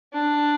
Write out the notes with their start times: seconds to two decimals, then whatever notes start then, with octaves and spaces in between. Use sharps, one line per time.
0.13 D4